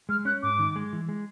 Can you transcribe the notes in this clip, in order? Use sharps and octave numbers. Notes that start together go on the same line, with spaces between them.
G#3 F6
C#4 F#6
G#2 D6
D#3
G#3
E3
G#3